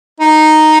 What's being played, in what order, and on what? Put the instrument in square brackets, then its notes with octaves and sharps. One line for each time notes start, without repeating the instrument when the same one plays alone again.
[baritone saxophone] D#4